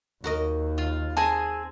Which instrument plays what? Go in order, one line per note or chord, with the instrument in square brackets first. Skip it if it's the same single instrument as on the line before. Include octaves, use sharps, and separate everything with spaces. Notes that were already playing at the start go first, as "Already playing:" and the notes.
[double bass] D#2 [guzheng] F#4 A#4 D#5
[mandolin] F4
[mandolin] C4 G#4 G#5 [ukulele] A5